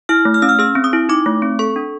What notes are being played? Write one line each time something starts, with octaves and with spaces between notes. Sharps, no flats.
E4 F6
A3
F6
C#4 E6
F6
G#4 E6
C4
D#6
E4
D#4 D6
A3
C4
A4 C#6
D4